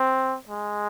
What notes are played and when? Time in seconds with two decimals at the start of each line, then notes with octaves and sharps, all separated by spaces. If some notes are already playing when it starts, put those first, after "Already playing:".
Already playing: C4
0.49 G#3